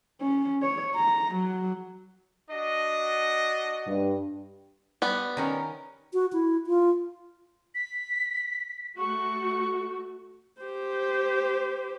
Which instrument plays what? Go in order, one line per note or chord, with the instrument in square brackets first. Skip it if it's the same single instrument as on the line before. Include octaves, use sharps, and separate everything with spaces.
[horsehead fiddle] C#4
C#5
A#5
F#3
[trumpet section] D4 F#4 D#5
[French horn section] G2
[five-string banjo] G3 B3
[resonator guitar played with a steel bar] D#3 C#4 A#4
[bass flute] F#4
E4
F4
[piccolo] B6
[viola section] A3 F#4 [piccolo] C#6
[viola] G4 C5